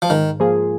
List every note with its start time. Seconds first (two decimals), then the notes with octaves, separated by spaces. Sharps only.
0.02 F3
0.09 G#2 D#3
0.40 F3 A#3 F4 G#4